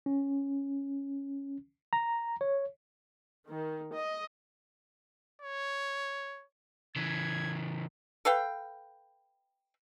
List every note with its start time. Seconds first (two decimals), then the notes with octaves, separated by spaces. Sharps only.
0.06 C#4
1.93 A#5
2.41 C#5
3.45 D#3
3.93 D#5
5.42 C#5
6.96 C#3 E3 G#6
8.25 A4 B4 F5 G5